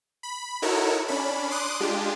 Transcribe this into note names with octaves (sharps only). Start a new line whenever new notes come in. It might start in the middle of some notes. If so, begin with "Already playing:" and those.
B5
D#4 E4 F#4 A4 A#4 C#5
C#4 D4 B5
C6 D6 D#6 F#6
G#3 D4 F4 G4